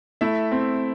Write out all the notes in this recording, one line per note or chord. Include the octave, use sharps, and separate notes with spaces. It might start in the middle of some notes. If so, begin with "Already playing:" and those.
A3 E4 E5
C4